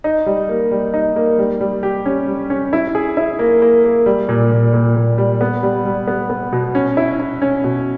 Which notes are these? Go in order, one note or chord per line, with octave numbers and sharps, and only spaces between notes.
D#4
G3
A#3
G3
D#4
A#3
G3
G3
G4
C#4
G3
C#4
E4
G#4
E4
A#3
A#3
A#3
G3
A#2
A#2
A#2
A#2
G3
B3
G3
G3
B3
B3
B2
C#4
E4
E4
C#4
B2